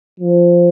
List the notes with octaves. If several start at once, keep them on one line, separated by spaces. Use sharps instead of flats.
F3